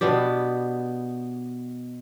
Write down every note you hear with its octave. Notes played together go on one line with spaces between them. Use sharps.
B2 B3 D4 G4